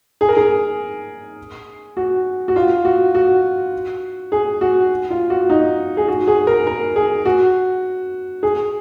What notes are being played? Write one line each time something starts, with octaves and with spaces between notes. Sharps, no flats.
G#4
A#4
G#4
F#4
F#4
F4
F#4
F#4
G#4
F#4
F4
F#4
D#4
G#4
F#4
G#4
A#4
A#4
G#4
F#4
G#4